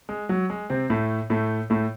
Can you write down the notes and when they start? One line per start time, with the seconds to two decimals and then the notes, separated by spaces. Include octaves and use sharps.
0.09 G#3
0.29 F#3
0.50 G#3
0.70 C3 C4
0.90 A2 A3
1.30 A2 A3
1.70 A2 A3